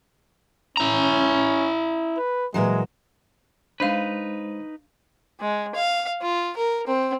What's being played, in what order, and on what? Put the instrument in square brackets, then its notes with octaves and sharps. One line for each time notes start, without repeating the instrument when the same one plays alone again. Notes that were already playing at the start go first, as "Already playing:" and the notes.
[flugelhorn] C#4 [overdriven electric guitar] E4 A#5
[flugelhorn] B4
[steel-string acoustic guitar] A#2 E3 F#3 [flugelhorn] G#3
[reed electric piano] G#3 C5 [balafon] D4 F5 [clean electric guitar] D#4 B4
[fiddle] G#3
F5
F4
A#4
C4